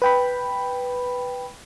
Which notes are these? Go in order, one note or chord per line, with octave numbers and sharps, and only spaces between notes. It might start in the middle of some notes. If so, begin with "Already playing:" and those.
B4 G5 B5